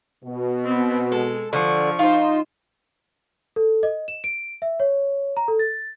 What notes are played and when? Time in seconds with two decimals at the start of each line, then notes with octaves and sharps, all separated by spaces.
0.23 B2
0.65 B3 C4
1.12 G#3 A4
1.53 D3 F3 C#6
1.99 D#4 F4 C5
3.56 A4
3.83 D#5
4.08 E7
4.24 D7
4.62 E5
4.80 C#5
5.37 A#5
5.48 A4
5.59 A6